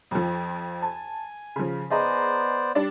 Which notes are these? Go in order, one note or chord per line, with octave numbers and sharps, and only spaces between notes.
F2 F3
G#5 A5
C#3 F3
B3 G#4 C5 D5 D#5 A#5
G3 D4 D5